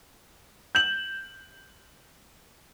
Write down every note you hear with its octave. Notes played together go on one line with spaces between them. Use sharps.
G6 E7 F#7